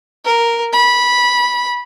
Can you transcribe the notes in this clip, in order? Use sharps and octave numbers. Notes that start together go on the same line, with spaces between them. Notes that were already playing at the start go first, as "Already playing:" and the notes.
A#4
B5